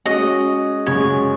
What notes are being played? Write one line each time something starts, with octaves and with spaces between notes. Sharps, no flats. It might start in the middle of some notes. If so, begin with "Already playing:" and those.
G#3 C#4 F#4 D#5
F#2 C#3 G#3 C#5